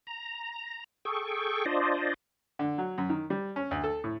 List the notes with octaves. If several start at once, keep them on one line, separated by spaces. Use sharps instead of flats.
A#5
G#4 A4 G5 C#6
D4 F4 C5 D5 D#5
D3
F#3
F#2
D#3
G3
C#4
D2
A4
A2